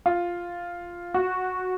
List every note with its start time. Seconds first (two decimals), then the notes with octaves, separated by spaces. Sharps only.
0.06 F4
1.14 F#4